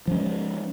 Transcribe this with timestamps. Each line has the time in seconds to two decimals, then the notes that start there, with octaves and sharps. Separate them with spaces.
0.07 F3
0.11 C#4
0.15 G#3